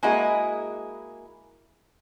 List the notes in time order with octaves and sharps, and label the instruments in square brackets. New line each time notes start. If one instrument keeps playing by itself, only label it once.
[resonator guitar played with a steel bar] G#3 A#3 E4 F#4 G#4 D#5